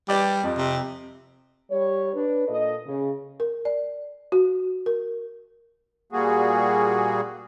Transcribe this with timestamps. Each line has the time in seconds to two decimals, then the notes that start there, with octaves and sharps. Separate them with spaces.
0.09 G3 B4 D5 D6
0.43 F2
0.57 C3
1.71 G3 C#5
2.14 D4 B4
2.48 A#2 A4 D#5
2.86 C#3
3.40 A#4
3.65 D5
4.32 F#4
4.86 A#4
6.12 A#2 G3 A#3 F#4 G#4